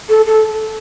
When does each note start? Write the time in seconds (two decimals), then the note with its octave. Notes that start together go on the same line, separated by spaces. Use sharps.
0.09 A4
0.26 A4